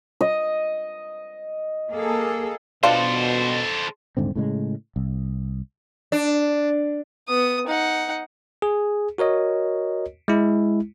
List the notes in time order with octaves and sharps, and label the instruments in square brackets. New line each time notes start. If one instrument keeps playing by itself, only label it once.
[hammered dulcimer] D#5
[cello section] A#3 G#4 A4
[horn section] B2 [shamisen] D4 F4 [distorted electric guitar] A4 C5
[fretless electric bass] D#1 G#2 D3 C4
A2 C#3 G#3
C2
[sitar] D4
[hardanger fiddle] B3 D#6
D#4 F#5
[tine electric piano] G#4
F#4 A#4 C#5 D#5
G#3 E4